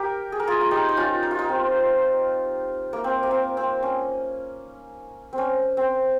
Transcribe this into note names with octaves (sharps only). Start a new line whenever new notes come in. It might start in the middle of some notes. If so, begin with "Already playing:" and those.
Already playing: G4 A#4
G#4
A#4
F4 G#4
F4
D#4 G4
D#4
C#4 F4
D#4
F4
D#4
C4
A#3
C4
A#3
C4
C4
C#4
C4
C#4
C4